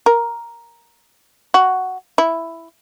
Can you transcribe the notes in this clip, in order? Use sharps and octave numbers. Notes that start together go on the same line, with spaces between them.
A#4
F#4
E4